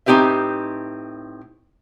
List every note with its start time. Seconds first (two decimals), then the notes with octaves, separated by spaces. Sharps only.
0.06 A2 C4 D#4 G4 B4 E5